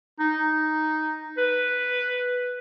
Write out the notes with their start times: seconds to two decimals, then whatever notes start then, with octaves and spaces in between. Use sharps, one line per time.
0.20 D#4
1.37 B4